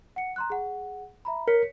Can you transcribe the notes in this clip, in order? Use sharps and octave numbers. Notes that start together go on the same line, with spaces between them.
F#5 C#7
A#5 C6 F#6
G#4 F#5
E5 A#5 B5
A#4 C#5 B6 C#7